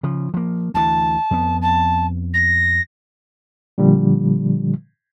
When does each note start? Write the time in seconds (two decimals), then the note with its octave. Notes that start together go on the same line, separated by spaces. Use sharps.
0.03 C#3 F3
0.34 F3 A#3
0.74 D2 E3 A5
1.31 F2 B3
1.61 A5
2.33 A#6
3.78 A#2 D3 F3 G3